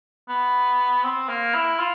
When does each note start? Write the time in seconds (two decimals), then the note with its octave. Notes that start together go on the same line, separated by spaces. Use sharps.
0.28 B3
1.03 C4
1.29 A#3
1.54 E4
1.79 F4